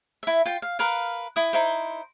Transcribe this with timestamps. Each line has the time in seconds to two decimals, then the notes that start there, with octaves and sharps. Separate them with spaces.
0.23 E4 E5
0.45 F4 G5
0.62 F5
0.79 A#4 B4 F5
1.36 E4 D#6
1.53 D#4 E4 C5